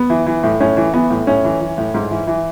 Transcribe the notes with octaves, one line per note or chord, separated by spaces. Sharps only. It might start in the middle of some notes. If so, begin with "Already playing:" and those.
Already playing: B3
E3
E3
A2
A2 C#4
E3
E3 B3
A2
A2 C#4
E3
E3
A2
G#2
E3
E3